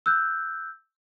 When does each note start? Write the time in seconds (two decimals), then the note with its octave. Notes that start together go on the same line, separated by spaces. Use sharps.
0.06 E6 F#6 G6